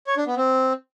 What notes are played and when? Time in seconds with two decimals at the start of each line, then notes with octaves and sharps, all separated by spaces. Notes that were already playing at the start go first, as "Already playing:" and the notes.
0.07 C#5
0.17 D4
0.27 B3
0.37 C4